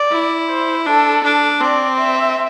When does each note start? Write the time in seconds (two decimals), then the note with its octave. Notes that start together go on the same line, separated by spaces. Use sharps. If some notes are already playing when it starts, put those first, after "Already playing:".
Already playing: D5
0.12 E4
0.49 C5
0.86 D4 A4
1.24 D4
1.60 C4 D5
1.98 E5